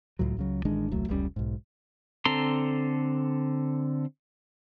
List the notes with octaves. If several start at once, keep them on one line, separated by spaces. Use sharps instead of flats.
C#2 A2 F#3
C#2 C#3 F#3
A1 D#3 G#3 D4
D#1 C2 F#3 A3
F1 C#2 G3 C#4
B1 G#2
D3 C4 A4 A#5 C6